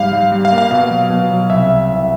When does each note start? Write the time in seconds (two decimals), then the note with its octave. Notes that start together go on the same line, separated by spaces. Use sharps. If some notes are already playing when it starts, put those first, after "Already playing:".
Already playing: G#2 G3 F5
0.13 G3
0.32 G3
0.45 F5
0.52 A#3
0.58 F5
0.71 B2 F5
0.91 F#3
1.10 B2
1.31 F#3
1.50 C2 E5
1.70 C2
1.89 C2